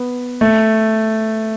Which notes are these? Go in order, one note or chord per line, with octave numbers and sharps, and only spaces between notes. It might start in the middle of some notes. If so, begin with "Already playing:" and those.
Already playing: B3
A3